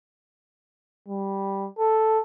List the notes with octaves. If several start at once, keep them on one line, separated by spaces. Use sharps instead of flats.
G3
A4